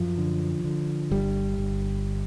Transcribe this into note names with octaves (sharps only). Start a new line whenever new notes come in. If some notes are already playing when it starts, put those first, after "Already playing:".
Already playing: F#2 F3
D3
D3
G1 G3
G1